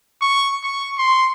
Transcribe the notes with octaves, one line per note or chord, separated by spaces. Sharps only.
C#6
C#6
C6